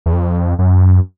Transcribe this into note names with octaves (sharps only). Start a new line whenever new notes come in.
E2
F2
F#2